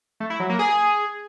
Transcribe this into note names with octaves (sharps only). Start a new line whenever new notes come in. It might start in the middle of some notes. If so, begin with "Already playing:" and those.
A3
E4
F#3
A#3
G#4